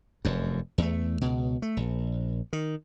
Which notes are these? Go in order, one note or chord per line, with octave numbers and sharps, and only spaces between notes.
F1 F#2
E2 G#3 A3
C#2 B2
A3
A#1
D#3